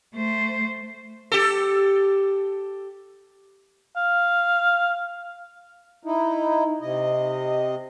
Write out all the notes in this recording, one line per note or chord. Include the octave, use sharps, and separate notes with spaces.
A3 C5
G4 A4
F5
D#4 E4
C3 D#5